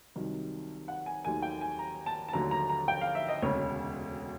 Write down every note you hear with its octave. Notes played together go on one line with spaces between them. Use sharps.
C2 C3 D#3 F#3
F#5
G#5
D#2 D#3 F#3 A3 G#5
G5
G#5
A#5
A5
A5
D#2 D3 F#3 A3 A#5
A#5
A#5
G5
F5
E5
D#5
E1 D2 C#3 C#5